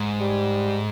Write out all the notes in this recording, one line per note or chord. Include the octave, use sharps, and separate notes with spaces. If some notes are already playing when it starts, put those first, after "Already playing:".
Already playing: G#2
G3